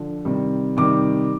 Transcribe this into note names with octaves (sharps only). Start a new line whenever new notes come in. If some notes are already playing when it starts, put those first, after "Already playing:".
Already playing: D3 F3
C3 D#3 G3
C3 D#3 G3 D6